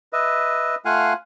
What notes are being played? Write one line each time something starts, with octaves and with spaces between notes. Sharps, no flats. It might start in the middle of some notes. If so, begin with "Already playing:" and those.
B4 D#5 E5
A3 F4 F5 F#5 G#5